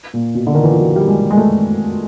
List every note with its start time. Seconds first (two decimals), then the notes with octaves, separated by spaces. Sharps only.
0.14 A#2
0.35 B2
0.47 D3
0.54 D#3
0.63 E3
0.71 F3
0.79 F#3
0.96 G3
1.07 G#3
1.30 G#3
1.37 A3